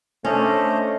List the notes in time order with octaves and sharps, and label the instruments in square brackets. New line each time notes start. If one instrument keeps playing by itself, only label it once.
[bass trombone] A3 [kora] C#4 [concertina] D4 C5 D#5